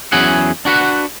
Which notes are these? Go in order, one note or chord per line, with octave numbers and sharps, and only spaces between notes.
E2 F#3 C#4 E4 G#4 F#5
D4 F#4 B4 F#5